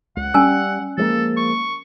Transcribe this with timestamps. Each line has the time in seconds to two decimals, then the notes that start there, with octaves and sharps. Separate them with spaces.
0.16 C#2 F#5
0.34 G3 C#4 G#5 E6
0.97 F3 G#3 A#3 A4
1.37 C#6